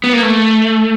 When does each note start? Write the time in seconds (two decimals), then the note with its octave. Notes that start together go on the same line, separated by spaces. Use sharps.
0.04 B3
0.13 A#3
0.23 A3